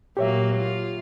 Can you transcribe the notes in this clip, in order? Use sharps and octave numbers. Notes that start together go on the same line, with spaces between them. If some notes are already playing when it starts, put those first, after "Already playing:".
A#2 F#3 A#3 G4 C#5 E5
F4